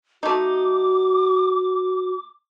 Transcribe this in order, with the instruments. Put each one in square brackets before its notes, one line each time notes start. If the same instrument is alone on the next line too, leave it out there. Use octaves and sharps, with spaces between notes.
[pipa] A3 D#4 [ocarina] F#4 [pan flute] D6